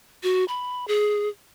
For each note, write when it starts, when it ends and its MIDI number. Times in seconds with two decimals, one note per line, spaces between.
0.23 0.44 66
0.48 0.87 83
0.88 1.29 68